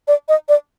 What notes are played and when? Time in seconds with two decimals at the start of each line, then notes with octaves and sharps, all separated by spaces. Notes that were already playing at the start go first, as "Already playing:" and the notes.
0.08 D5
0.29 D#5
0.49 D5